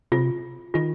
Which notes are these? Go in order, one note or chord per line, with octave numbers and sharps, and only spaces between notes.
C3 F4
D#3 F4